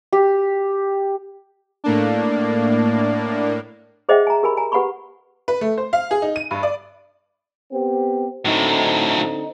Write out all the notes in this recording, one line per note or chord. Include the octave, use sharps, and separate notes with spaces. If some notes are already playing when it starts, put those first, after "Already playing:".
G4
A2 A#3 D4
G#4 C5 D#5 E5 F#5 G5
G#5 A#5
G4 A#4 G#5 B5
G#5 A#5
G4 B4 F#5 G#5 B5 C#6
B4
A3
C5
F5
G#4
D#4
D#7
G2
D5
B3 C4 G4
A2 D3 F#3 C4 D#4